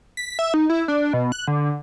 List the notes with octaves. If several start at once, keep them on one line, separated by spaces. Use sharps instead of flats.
B6
E5
D#4
E4
D4
B2
F#6
D3